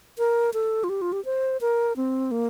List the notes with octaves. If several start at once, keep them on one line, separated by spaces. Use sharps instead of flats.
A#4
A4
F4
G4
F4
G4
C5
A#4
C4
A#3